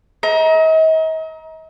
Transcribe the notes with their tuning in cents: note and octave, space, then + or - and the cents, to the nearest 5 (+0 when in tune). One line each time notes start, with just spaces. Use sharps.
D#5 +45 A#5 +25